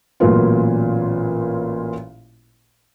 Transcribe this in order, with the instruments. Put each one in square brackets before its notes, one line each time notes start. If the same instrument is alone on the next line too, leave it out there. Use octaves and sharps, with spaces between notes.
[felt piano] A1 A#2 F#3 A#3 B3 F4